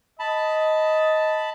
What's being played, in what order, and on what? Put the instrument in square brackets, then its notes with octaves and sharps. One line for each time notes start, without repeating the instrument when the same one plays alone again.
[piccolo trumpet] D#5 [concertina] A5 B5